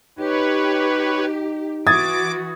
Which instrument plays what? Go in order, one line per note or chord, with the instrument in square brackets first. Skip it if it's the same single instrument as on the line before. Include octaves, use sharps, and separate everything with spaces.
[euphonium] D#4 [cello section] G4 [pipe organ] B4 C#5
[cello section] E3 F#4 [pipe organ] D6 [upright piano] D#6 G#6 A6